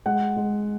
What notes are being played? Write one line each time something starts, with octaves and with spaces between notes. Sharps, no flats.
G#3 F#5
G#3